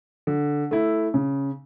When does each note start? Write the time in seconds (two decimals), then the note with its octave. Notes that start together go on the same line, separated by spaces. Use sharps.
0.27 D3
0.71 A3 E4
1.14 C#3